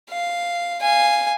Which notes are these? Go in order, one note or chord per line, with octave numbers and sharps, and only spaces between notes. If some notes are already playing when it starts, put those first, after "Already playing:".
F5
F5 G#5